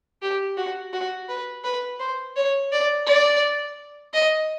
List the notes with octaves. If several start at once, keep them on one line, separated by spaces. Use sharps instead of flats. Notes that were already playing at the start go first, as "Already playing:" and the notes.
G4
F#4
F#4
B4
B4
C5
C#5
D5
D5
D#5